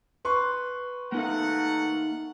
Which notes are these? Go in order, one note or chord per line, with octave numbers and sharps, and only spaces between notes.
B4 C6 C#6
A3 A#3 D#4 A#4 F5 F#5